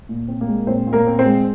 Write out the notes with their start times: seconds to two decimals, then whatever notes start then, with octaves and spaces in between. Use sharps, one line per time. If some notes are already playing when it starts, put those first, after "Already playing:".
0.09 A#2
0.28 C4
0.41 A#3 A#4
0.48 G#3
0.67 A#2 C4 C5
0.87 A#2
0.93 A#3 A#4
1.07 C4
1.19 C4 C5
1.25 G#3